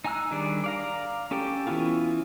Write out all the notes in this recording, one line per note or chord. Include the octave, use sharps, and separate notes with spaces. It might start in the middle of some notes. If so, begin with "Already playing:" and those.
D#4 G#5 A#5 E6 F#6
D#3 G3 D4 G#4 D5
D5 F5 A#5
C#4 G4 A4 G5
E3 B3 C#4 E4 F4